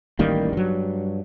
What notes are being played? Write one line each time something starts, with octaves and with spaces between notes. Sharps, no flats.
A1 D#3 G3 A#3
G2 F#3